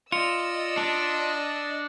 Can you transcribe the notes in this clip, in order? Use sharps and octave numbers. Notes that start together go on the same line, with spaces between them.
F4 D5 D#5 E6 C#7
D4